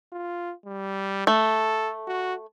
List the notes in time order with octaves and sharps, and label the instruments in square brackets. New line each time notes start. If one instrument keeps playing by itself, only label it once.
[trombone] F4
G3
[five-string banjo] A3 [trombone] A4
[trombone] F#4